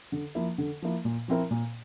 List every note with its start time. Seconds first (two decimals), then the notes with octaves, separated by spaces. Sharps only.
0.12 D3
0.35 F3 A#3 E4
0.58 D3
0.82 F3 A#3 E4
1.05 A#2
1.28 F3 C4 E4 A#4
1.51 A#2